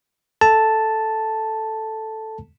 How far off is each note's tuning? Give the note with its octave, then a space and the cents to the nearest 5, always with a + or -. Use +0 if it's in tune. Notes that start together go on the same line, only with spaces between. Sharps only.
A4 +0 A5 +0